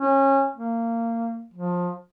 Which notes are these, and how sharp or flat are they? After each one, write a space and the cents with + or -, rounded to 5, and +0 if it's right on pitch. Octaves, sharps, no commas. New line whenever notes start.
C#4 -25
A#3 -20
F3 +20